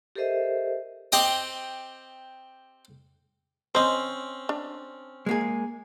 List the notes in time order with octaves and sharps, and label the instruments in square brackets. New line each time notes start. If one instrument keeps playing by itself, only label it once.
[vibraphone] G4 A4 A#4 C5 D#5 E5
[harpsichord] C4 G4 D#5 D#6
[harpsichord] C4 C#4 [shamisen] C5 D#5
[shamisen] D4
[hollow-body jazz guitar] G#3 A#3 G#4